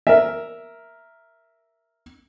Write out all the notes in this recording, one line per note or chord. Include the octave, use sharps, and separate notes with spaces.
A#4 E5